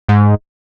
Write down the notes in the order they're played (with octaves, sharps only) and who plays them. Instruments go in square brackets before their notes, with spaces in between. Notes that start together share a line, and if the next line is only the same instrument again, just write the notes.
[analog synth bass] G#2